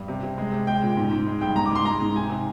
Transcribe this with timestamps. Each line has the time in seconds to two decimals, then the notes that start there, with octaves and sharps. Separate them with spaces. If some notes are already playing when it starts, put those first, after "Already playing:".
Already playing: G2
0.08 C3
0.23 C3
0.38 G#3
0.52 C3
0.67 G#3 G5
0.82 A#2
0.97 G#2
1.11 G#2
1.26 G#3
1.41 G2 G5
1.56 G#2 A#5
1.66 D6
1.71 G#2 C6
1.85 G#3 A#5
2.01 G#2
2.16 C3 G#5
2.30 C3